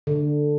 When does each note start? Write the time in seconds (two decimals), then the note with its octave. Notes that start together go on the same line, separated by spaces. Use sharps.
0.07 D3